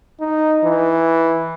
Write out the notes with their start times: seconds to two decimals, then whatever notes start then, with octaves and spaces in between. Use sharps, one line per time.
0.20 D#4
0.64 E3